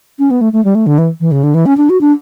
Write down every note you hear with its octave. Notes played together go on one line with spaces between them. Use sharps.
C#4
B3
A3
A3
G3
A3
D3
E3
E3
C#3
D3
E3
C#4
D4
F#4
D4